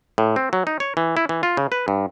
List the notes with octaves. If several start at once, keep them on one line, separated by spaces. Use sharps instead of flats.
A2
C4
F#3
D#4
C#5
E3
E4
E3
F4
C#3
B4
G2